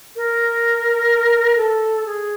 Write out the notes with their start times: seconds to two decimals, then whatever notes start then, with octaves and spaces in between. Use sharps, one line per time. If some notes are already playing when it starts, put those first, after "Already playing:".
0.16 A#4
1.57 A4
2.06 G#4